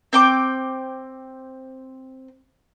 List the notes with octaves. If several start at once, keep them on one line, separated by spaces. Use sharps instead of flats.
C4 G5 D6